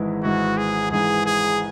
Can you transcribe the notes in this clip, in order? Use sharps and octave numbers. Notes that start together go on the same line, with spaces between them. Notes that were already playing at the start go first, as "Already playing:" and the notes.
Already playing: G#1 G#2 E3 G#3 E4
G#1 G#2 E3 G#3 E4 F#4
G#4
G#1 G#2 E3 G#3 E4 G#4
G#4